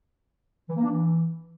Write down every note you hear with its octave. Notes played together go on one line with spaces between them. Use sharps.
E3
A#3
D4
E3